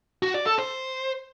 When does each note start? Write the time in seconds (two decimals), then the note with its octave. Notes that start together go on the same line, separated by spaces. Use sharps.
0.22 F#4
0.34 D5
0.46 A4
0.58 C5